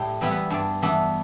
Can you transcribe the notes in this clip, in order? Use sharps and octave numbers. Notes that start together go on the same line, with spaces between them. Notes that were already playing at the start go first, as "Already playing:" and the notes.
Already playing: A2 A3 D4 G4
E3 G3 B3 E4
B3 B4
G2 D4 D5
E3 B3 D4